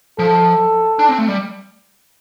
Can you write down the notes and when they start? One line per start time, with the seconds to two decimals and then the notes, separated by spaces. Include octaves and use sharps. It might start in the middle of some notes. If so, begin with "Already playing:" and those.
0.19 F3 A4
0.99 D4
1.09 C4
1.18 A3
1.28 G3